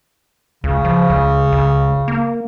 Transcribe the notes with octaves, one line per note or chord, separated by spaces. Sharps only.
C#2 C#3
F3
C#2
C#2
A#3